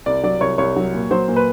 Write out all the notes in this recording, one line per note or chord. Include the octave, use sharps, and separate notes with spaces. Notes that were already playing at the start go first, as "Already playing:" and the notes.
C2 D5
F#3 D5
C2 C#5
C2 C#5
F#3
A#2
F#3 C5
A#2
B4